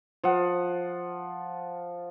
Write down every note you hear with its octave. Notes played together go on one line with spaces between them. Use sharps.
F3 F#5